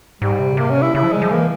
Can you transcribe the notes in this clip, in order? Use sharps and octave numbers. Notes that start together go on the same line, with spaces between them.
G#2 G3
C3
C#3
C3 A#3
C#4
E4
C#3 E4
F3
G3 G#3
F3
E3 A#3